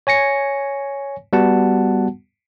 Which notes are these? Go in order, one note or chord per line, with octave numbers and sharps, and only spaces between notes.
C#5 G#5 A#6 C#7
G3 B3 F#4 F#5 A5